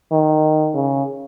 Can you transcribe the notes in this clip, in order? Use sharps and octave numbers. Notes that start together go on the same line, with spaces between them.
D#3
C#3